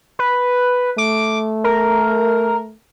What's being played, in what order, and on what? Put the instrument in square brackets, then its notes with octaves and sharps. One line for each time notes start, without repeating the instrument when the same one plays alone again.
[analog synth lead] B4
[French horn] A3 [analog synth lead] D6
[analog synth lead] A#4